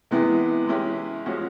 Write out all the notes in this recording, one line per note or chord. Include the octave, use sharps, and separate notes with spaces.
C3 E3 G#3 B3 E4
G#3 C#4 E4 G4
F3 G#3 C#4 F#4